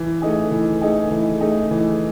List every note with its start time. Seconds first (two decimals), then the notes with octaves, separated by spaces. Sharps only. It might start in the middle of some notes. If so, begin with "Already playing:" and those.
Already playing: E3
0.22 A3 D#4 G#4
0.51 E3
0.81 A3 D#4 G#4
1.11 E3
1.41 A3 D#4 G#4
1.71 E3